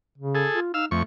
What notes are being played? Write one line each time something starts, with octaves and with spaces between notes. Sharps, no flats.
C#3
G#4 A4
F4
D#4 F5 E6
F2 A3 C#6